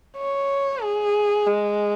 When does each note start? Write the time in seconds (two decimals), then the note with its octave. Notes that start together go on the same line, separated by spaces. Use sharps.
0.18 C#5
0.82 G#4
1.47 G#3